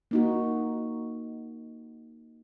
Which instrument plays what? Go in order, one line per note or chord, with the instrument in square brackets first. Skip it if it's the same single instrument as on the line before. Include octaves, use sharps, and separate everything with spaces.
[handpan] A#3 D#4 F#4